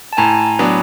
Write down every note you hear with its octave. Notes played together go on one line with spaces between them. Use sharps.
A5
A2 G#5 A#5
F#3 B3 D4